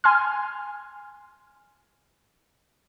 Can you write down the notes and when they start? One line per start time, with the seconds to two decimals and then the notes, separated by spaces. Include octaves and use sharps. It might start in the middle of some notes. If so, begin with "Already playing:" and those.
0.04 G#5 C6 F6